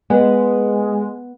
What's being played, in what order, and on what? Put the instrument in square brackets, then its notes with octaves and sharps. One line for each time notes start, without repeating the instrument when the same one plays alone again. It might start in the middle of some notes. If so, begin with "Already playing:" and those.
[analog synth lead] G#3 [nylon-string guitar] B3